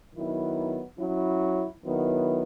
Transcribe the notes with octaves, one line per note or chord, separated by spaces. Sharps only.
D#3 F#3 B3 E4
F#3 C#4 E4
D#3 F#3 B3 E4